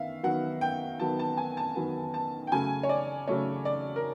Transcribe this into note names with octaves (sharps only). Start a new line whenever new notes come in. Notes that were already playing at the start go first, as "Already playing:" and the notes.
Already playing: D#3 B3 E5 F5
D#3 F#3 B3 F#5
G5
D#3 F#3 B3 A5
A5
G#5
A5
D#3 F#3 B3
A5
G5
C#3 F#3 A3 G#5
C#5
D5
C#3 F#3 A3 C#5
D5
A#4